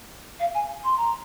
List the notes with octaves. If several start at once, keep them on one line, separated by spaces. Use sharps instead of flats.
F5
G#5
C6
A#5